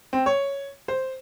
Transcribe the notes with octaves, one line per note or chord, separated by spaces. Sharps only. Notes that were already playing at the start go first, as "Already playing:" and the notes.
C4
C#5
C5